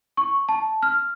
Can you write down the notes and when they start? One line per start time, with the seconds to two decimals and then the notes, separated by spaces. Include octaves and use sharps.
0.17 C#6
0.49 A5
0.83 F6